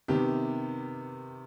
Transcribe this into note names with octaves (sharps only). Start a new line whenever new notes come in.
C3 D#3 B3 G4